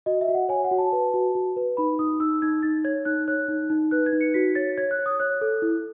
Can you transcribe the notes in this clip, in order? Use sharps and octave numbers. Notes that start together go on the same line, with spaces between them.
F#4 D#5
E5
F#4
F#5
C#5 G#5
F#5
F#4
A5
B4
F#4
F#4
B4
D#4 B5
D#4 D#6
D#4 E6
D#4 G#6
D#4 A6
C#5 G#6
D#4 F#6
C#5 F#6
D#4
D#4
B4 F#6
G#6
D#4
C#7
F#4 B6
C#5 A6
C#5 G#6
F#6
C#5
D#6
C#5 F#6
A4
E4